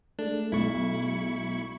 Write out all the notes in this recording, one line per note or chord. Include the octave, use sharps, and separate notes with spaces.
G#3 A3 D4
B1 E4 C#6